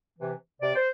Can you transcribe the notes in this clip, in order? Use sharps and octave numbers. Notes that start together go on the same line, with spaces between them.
C3 E3
C3 D5
C5